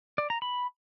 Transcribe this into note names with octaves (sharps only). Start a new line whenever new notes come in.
D5
A#5
B5